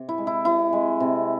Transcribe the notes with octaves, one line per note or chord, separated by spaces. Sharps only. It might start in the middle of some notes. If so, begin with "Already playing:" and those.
Already playing: C3
E4
G#3
E4
C3 E4
G#3
C3